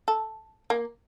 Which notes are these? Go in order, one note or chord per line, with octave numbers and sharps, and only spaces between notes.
A4
A#3